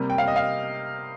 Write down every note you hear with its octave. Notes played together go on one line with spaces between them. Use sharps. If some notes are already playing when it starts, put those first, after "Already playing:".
Already playing: C3 G3 A#3
G5
F5
D#5
F5